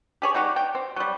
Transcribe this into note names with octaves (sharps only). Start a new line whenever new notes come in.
G4 G#4 C#5
G3 D#4 F#4 G4
G5
C4
F#3 G3